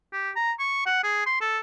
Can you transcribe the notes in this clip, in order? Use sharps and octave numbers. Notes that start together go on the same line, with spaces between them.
G4
A#5
C#6
F#5
G#4
C6
A4